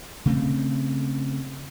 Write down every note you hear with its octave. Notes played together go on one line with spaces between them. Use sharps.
C#3 A3 C4